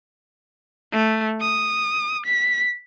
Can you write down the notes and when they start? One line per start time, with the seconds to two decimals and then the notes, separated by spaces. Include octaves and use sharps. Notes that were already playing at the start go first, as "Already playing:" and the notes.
0.92 A3
1.41 D#6
2.26 B6